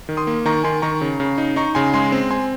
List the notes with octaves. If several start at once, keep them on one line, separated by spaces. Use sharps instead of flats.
D#3
C6 D#6
A#3
D#3 A#5 C#6
D#3 G#5 C6
D#3 A#5 C#6
C#3
C#3
D#4
D#4 A#5 C#6
C#3 G#5 C6
G#3 G#5 C6
C4
C4 G#5 C6